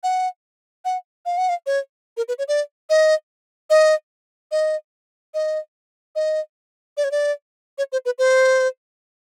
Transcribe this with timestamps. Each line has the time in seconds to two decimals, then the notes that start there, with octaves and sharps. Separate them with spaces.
0.03 F#5
0.85 F#5
1.26 F5
1.37 F#5
1.49 F5
1.66 C#5
2.17 A#4
2.28 B4
2.38 C#5
2.48 D5
2.90 D#5
3.70 D#5
4.51 D#5
5.34 D#5
6.15 D#5
6.97 D5
7.04 C#5
7.11 D5
7.78 C#5
7.92 C5
8.05 B4
8.18 C5